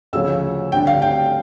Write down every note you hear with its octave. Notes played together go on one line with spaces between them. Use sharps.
D2 C#3 F3 C#4 E6
D2 D3 G3 D4 G5
F5
G5